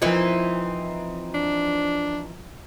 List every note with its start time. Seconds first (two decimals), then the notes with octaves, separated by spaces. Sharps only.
0.02 E3 F3 C4 D#4 F4
1.35 D4